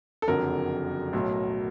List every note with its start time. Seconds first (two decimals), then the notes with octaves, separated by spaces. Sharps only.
0.22 A4
0.28 F#1 F2 D3 F#3 A#4
1.13 B1 A2 F#3